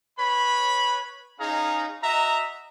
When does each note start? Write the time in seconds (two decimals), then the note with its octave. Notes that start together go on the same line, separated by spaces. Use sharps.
0.18 B4 C#5 B5
1.39 C#4 D#4 G#4 F5 A#5
2.02 F#4 D#5 E5 A#5